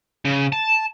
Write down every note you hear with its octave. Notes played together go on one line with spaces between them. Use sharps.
C#3
A5